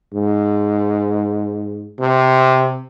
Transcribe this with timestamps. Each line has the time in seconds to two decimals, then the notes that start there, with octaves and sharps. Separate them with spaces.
0.14 G#2
1.99 C3